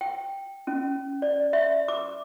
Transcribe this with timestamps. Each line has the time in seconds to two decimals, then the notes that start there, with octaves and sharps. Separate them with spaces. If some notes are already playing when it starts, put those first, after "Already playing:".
0.01 G5
0.67 C#4
1.22 D5
1.53 E5
1.88 D6